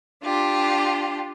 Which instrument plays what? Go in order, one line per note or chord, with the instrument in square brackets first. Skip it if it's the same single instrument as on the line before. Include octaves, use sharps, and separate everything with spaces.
[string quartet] D4 F4 G4